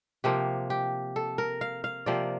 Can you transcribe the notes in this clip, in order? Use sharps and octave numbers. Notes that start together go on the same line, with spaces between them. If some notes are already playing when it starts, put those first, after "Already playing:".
C3 F3 A#3 G4
G4
A4
A#4
F5
F5
C3 F3 A#3 D5